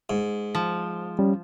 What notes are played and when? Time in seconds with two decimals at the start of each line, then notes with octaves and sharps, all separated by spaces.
0.10 G#2
0.55 F3
1.19 G3 C#4